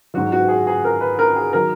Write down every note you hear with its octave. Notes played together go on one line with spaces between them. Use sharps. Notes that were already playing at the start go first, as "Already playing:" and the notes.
G#2 F#3 F#4
F#4
G#4
G#4
A#4
B4
A#4
G#4
D#3 F#3 A#4